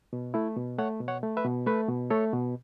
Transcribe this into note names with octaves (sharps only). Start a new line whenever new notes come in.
B2
A3 E4
B2
A3 C#5 F#5
B2
C#5 F#5
A3
B4 E5
B2
A3 B4 E5
B2
A3 A4 C#5
B2